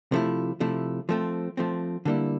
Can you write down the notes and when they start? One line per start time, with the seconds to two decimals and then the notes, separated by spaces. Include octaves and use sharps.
0.12 C3 F3 A3 E4
0.60 C3 F3 A3 E4
1.09 F3 A3 C4
1.57 F3 A3 C4
2.05 D3 G3 A#3 E4